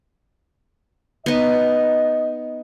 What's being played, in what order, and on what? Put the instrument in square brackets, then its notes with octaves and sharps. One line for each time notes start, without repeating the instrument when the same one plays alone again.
[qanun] B3 D#4 [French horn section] D#5